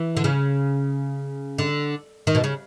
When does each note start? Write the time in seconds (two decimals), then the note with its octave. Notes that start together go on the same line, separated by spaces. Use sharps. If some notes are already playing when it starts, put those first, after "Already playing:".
Already playing: E3
0.17 D3
0.24 C#3
1.58 D3
2.27 D#3
2.35 B2
2.44 C#3